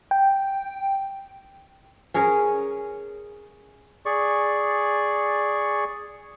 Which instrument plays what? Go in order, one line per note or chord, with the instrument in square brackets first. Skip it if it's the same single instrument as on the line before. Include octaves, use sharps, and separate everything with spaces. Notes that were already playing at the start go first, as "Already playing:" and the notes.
[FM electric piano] G5
[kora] C#4 G#4 A#4 C#5
[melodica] G#4 D5 C#6